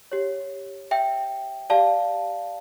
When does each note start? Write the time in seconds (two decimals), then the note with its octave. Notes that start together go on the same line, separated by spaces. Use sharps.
0.12 G4 C#5
0.91 E5 G5
1.70 G4 D5 F5 A5